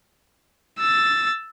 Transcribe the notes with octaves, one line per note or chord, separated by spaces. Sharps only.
E6 A6